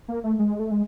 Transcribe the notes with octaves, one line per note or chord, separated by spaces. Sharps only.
A#3
A3
G#3
A3
G#3